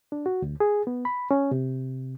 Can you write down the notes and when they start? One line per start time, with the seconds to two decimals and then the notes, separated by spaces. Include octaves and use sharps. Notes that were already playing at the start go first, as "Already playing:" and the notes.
0.12 D4
0.26 F#4
0.42 D2
0.60 G#4
0.87 B3
1.05 B5
1.31 C#4
1.51 C3